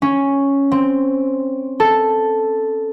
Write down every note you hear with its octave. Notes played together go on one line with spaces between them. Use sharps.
C#4
C4
A4